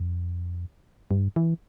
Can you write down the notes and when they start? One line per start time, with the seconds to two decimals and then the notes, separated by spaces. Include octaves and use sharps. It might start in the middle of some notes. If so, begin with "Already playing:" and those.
Already playing: F2
1.11 G2
1.36 E3